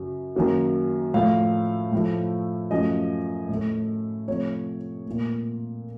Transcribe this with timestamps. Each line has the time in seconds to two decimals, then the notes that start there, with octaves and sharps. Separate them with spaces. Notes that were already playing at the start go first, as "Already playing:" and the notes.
Already playing: F#2 C#3 F#3
0.35 F#2 D#3 F#3 A#3
1.14 A2 F3 A3 F5
1.92 A2 F3 A3
2.71 F#2 F3 A3 D#5
3.49 A2
3.54 A3
4.28 C3 F3 A3 C#5
5.06 A#2 A3